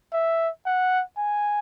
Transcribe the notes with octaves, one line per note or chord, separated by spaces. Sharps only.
E5
F#5
G#5